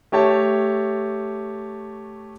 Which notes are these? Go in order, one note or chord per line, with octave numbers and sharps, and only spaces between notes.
A3 G4 C#5 A5